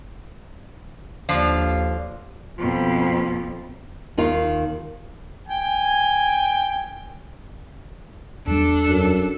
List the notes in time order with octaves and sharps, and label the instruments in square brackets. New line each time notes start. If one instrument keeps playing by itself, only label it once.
[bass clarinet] D#2 [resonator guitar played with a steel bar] D3 F3 F4
[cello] F2 B2 [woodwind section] F3 A#3 F4
[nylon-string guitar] D#2 D#3 F4 F5
[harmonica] G5 [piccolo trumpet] G#5
[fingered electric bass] E2 G3 [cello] D4 A4
[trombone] F#2